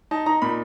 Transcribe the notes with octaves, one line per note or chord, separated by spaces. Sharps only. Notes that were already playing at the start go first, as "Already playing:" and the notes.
D#4 A5
D#4 A#5
A#2 B5